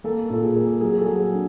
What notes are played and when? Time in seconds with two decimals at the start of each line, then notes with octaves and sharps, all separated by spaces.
0.04 A#3 A4
0.30 A#2 A4
0.43 G#4
0.55 A#3
0.81 F#3 G#4
0.99 A4
1.07 F#3 G#4
1.33 D4